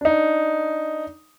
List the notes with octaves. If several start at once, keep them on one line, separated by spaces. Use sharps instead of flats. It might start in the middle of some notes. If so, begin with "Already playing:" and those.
D4 D#4